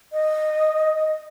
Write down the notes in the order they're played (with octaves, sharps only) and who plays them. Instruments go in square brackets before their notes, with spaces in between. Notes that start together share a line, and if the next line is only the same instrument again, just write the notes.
[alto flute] D#5